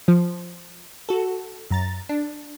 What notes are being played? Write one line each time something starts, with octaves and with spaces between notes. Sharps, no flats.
F3
F#4 A4
F#2 A#5 A6
D4